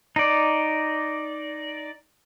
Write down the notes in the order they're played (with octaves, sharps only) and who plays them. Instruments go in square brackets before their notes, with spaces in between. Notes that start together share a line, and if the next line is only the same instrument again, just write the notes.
[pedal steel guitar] D#4 D5